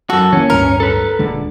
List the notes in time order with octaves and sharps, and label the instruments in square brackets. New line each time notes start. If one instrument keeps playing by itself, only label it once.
[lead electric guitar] F#2 F#4 [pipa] A4
[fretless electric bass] E3 A#3 [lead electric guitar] C#4
[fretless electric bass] D1 D2 G2 [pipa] A#4
[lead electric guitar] A4 B4
[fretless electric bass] D#1 D3 G#3